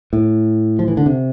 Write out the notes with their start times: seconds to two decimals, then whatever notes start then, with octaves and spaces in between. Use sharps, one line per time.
0.13 A2
0.79 F3
0.88 E3
0.97 D3
1.06 C3